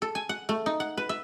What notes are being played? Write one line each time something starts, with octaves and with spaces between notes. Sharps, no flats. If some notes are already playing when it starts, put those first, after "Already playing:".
A4
G#5
F#5
A3
D#4
F#5
B4
E5